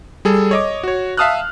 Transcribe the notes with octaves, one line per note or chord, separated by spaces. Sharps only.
G3 G#4 A4
C#5 D#5 D6
F#4 C#5
E5 F5 A5 D#6 F6 F#6